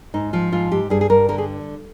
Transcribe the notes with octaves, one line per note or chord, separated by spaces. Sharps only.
G#2 D#4
F3 F4
G#2 F4
G#2 G4
G2 G#4
G#4
G2 A#4
D3 A#4
G#4